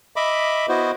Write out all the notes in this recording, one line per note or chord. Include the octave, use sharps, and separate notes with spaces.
D#5 E5 B5 D6
B3 E4 F#4 C5 D#5